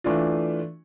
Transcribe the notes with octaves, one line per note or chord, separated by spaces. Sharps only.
E3 A3 D4 F4